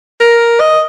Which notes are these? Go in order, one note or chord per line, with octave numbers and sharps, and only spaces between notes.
A#4
D#5